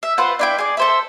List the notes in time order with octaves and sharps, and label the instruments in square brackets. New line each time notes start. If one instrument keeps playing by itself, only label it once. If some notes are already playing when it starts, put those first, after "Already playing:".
[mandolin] E5
F4 B4 C5 F#5
D4 E4 G5
G#4 D5
A4 C5 E5